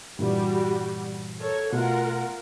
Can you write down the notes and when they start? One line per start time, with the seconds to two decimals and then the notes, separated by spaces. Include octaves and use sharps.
0.19 G2 A#2 E3 G3 F#4
1.40 A4 A#4 C#5
1.73 B2 A3 F4 A#4 F#5